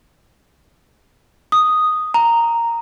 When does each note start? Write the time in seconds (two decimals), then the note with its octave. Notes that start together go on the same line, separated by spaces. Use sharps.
1.52 D#6
2.14 A#5